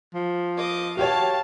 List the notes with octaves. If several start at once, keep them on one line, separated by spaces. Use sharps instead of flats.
F3
D#5 D6
F#4 G4 C#5 F5 A5